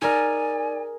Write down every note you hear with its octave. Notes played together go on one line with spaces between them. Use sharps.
D#4 G#4 A#4 D5 G#5